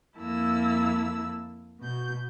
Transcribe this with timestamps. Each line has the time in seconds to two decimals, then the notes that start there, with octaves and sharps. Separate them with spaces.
0.18 F2 A#3 E4 A5 E6
1.79 B2 G6